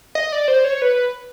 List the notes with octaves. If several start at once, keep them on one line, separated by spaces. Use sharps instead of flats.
D#5
D5
C5
C#5
B4